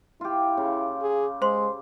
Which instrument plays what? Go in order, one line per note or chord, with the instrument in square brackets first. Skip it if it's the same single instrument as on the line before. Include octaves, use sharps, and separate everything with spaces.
[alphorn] E4 [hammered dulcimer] F4 G4
[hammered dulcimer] C#3
[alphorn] G#4
[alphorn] G#3 [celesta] C5 C6